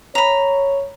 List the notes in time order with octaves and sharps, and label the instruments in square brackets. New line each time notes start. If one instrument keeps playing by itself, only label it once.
[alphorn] C#5 [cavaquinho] A#5 B5